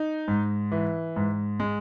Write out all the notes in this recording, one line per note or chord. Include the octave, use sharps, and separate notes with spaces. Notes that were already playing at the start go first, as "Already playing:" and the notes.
Already playing: D#4
G#2
E3
G#2
G#3